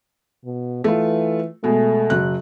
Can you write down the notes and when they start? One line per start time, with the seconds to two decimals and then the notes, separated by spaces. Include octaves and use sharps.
0.45 B2
0.84 E3 A3 F4
1.64 B2 G#3 A3
2.10 F#1 F#3 F#6